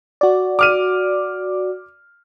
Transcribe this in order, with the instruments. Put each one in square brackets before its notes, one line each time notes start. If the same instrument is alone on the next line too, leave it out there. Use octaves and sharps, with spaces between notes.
[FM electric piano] F#4 D5
[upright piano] D6 F6 D#7